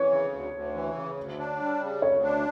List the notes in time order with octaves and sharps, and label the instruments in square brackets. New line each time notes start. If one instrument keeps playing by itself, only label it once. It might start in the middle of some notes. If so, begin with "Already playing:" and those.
Already playing: [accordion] E3 [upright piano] C#5
[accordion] C#3
D2
D2
E3
C#3
D2
D4
G3
C#3
[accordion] D2 [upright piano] C#5
[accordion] D4